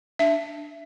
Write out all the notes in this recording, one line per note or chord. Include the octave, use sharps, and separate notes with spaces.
D4 E5